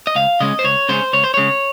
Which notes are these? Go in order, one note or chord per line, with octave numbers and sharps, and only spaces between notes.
D#5
C#2 F5
C#3 G#3 C#4 D#5
C5
C#2 C#5
C#3 G#3 C#4 C5
C#2 C#5
C5
C#3 G#3 C#5